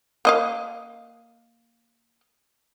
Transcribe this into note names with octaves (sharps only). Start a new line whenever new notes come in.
A#3 D#5 F5